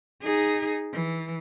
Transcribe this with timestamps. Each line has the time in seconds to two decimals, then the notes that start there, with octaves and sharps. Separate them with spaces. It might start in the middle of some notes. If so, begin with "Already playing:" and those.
0.22 D#4 G#4
0.93 E3